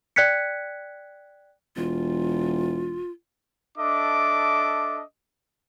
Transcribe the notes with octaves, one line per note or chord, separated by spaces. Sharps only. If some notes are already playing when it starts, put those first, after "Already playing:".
D5 G5 F#6 G#6 B6 C#7
E1 F4
D4 A4 D#5 E5 D6